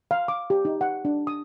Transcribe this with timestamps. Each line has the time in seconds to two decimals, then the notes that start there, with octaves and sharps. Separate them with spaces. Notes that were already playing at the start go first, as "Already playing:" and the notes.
0.11 F5
0.28 D6
0.50 G4
0.65 D#4
0.81 F#5
1.05 D4
1.27 D#6